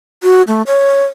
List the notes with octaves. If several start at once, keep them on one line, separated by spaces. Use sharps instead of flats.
F#4
A3
C#5